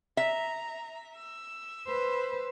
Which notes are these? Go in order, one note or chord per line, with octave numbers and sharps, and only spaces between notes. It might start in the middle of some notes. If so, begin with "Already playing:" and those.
E5 A#5
E6
B4 C5